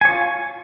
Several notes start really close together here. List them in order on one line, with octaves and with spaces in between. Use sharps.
G#5 C#5 F4